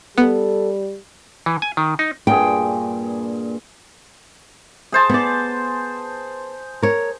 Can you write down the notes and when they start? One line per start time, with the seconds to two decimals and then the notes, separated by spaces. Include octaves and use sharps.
0.18 G3 B3 A4
1.46 E3
1.62 G#5
1.77 D#3
1.99 D#4
2.27 G2 A#2 G#4 G5
4.92 G#4 C5 A5
5.09 B3 D5
6.82 A#4 C#5